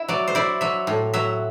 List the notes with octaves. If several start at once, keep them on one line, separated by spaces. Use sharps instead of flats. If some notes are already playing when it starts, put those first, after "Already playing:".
Already playing: E4 E5
F#3 D5
C5
E4 D5
F#3 E5
A2
F#3 E5